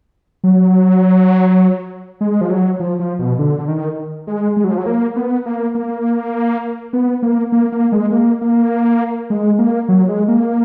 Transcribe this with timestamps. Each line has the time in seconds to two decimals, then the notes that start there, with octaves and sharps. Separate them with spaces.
0.44 F#3
2.21 G#3
2.41 F3
2.50 F#3
2.80 F3
3.00 F3
3.19 B2
3.39 D3
3.58 D3
3.68 D#3
4.27 G#3
4.57 G#3
4.64 F#3
4.71 F3
4.78 F#3
4.86 A#3
5.16 B3
5.46 A#3
5.75 A#3
6.93 B3
7.23 A#3
7.52 A#3
7.72 A#3
7.92 G#3
8.12 A#3
8.41 A#3
9.30 G#3
9.59 A#3
9.89 F#3
10.09 G#3
10.28 A#3